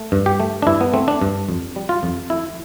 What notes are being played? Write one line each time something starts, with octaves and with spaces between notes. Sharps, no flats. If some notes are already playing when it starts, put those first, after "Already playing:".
Already playing: A3
G2
G4
A3
D4
G2 E4
B3
A3 C4
D4
G2
F2
G3
F4
F2
A3 E4